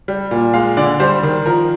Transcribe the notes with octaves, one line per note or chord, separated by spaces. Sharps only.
G3
A#2
G#3 F5
D3 D5
G3 C5
D#3
F3 A#4